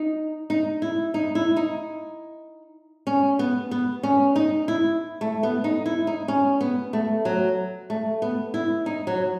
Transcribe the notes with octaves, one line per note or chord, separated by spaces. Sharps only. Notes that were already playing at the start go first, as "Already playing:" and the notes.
Already playing: D#4
D#4
E4
D#4
E4
D#4
C#4
B3
B3
C#4
D#4
E4
A3
B3
D#4
E4
D#4
C#4
B3
A3
F#3
A3
B3
E4
D#4
F#3